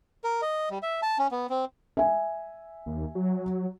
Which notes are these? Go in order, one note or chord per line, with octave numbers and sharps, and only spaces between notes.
A#4
D#5
G3
E5
A5
C#4
B3
C4
E5 G#5
D#2
F#3